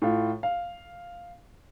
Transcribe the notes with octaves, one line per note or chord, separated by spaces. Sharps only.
A2 F4
F5